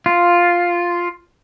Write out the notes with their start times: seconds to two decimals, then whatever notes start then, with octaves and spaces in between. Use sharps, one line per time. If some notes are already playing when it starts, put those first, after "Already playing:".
0.06 F4